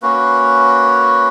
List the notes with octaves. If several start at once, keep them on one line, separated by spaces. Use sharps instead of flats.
A#3 C#4 F#4 B4